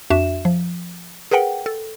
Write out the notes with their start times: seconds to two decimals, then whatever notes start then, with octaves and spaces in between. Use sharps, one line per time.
0.10 F2 D4 F#4 E5 E7
0.45 F3
1.31 G#4 A#4 B4 F#5 G5
1.66 A4